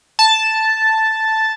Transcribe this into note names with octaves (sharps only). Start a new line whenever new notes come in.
A5